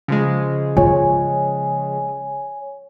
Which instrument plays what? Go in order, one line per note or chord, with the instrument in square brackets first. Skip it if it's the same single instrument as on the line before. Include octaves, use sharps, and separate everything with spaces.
[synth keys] C#3 F3 G#3
[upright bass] F4 [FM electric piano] C#5 G#5